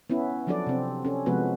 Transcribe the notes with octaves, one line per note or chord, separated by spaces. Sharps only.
B3 C#4 E4
F3 F#3 D4 F#4 A4 D5
C3 C4
C#4 A4
C3 F3 G#3 B3 F#4 B4